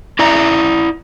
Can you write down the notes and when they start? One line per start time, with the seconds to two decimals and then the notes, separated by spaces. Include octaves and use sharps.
0.19 E4 D5 A#5